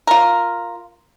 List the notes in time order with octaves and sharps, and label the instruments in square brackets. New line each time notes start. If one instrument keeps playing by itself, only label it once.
[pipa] F4 A#4